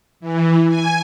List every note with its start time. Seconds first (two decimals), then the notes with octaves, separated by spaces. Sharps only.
0.20 E3
0.68 G#5